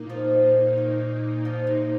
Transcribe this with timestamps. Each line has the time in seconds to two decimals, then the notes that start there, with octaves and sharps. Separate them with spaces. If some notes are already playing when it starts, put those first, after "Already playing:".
Already playing: A#2 A#3 D#4
0.10 F3
0.77 D#3
1.45 F3
1.67 C3